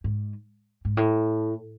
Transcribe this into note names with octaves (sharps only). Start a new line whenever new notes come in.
G#2
G#2
A2